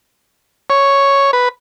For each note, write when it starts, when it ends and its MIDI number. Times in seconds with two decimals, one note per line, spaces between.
0.70 1.31 73
1.33 1.49 71